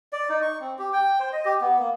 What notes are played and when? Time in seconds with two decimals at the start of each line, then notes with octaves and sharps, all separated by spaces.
0.13 D5
0.30 D#4
0.42 C#6
0.60 C4
0.79 G4
0.93 G5
1.20 C5
1.33 D#5
1.45 G4
1.61 B3
1.79 A#3